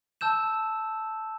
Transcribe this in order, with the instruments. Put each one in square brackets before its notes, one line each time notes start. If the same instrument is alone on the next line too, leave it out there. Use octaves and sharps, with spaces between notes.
[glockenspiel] A5 E6 G6 E7